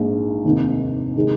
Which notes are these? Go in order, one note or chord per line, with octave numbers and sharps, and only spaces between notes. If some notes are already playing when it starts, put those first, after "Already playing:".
Already playing: A#1 G#2 G#3
F1 D#2 D#3
C3 D#3 G#3